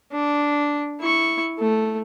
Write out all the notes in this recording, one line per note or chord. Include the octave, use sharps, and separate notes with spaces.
D4
E4 C#6
A3